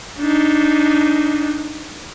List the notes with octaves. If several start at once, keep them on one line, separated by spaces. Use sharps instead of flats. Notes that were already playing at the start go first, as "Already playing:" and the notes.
D4 D#4